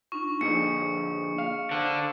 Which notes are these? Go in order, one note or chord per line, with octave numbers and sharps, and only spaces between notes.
D4 D#4 F4 C#6
A#2 D3 F3 G#4 D#5 C#7
F5
D3 D4 C5